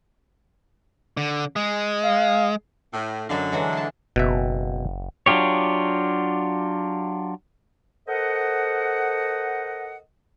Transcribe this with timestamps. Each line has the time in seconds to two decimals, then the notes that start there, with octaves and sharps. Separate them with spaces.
1.17 D3
1.56 G#3
2.04 F5
2.93 A2
3.29 F#2 D3 G#3 F5
3.52 E3 F#3 G#3
3.73 G#4 A5
4.16 F#1 B2 E5
5.26 F#3 D4 F4 G4 C#5
8.08 A4 A#4 C5 D#5 F#5